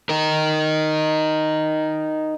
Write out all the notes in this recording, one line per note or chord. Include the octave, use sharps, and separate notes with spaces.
D#4 A#4